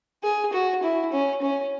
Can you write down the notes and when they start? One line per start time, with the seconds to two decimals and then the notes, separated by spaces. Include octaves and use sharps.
0.23 G#4
0.53 F#4
0.83 E4
1.12 C#4
1.42 C#4